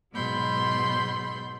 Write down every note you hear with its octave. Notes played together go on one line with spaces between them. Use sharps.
G#2 B2 F#3 B5 C6 G6